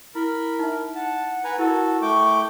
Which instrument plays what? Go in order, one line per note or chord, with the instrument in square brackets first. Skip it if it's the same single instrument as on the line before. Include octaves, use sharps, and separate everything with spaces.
[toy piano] E4 [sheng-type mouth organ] A#4 B5
[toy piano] D#4 E5
[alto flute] F#5 [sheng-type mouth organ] A5
[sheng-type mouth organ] B4 G#5 A#5
[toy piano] E4 A#4 [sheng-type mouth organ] F#4 A4
[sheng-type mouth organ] A3 G5 D6 [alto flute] C#6